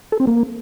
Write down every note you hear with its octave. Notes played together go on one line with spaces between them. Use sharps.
A4
C4
A#3